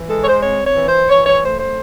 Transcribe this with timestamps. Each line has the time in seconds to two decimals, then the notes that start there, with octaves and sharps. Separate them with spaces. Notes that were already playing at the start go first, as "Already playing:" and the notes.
Already playing: E3
0.09 G#3 A4
0.22 C#5
0.27 C5
0.42 C4 C#5
0.66 C#5
0.76 E3
0.87 C5
1.09 E3 C#5
1.26 C#5
1.43 A3 C5
1.60 C5